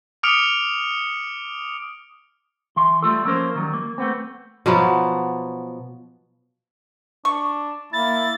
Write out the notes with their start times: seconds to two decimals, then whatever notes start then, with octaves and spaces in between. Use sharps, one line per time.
0.23 D6 D#6 F6 C#7 D7 F7
2.76 E3 C6
3.02 G3 A3 F4 A4
3.25 F3 A#3 C#4 A#4 C5
3.55 D#3 F#3 G3
3.73 A#3
3.98 A3 B3 C4
4.66 B2 F3 F#3 B3
7.25 D4 C#6
7.93 A#3 E4 A6